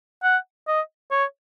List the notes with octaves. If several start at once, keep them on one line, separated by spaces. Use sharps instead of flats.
F#5
D#5
C#5